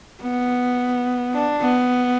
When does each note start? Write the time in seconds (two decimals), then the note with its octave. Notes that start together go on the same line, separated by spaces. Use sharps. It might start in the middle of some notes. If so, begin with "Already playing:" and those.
0.21 B3
1.34 D4
1.62 B3